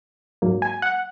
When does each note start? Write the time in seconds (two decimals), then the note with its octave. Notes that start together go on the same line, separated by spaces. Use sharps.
0.42 G#2 F#3 A#3
0.62 G#5
0.82 F#5